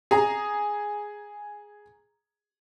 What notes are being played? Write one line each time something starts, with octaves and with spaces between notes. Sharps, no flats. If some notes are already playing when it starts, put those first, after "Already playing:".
G#4 A#5